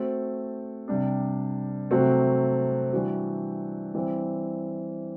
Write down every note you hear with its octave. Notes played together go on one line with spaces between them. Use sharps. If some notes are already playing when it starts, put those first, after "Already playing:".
Already playing: A3 C4 F#4 A4 C5
C3 G3 D4
C3 F#3 A3 C4 F#4
E3 G3 D4 F#4
E3 G3 C4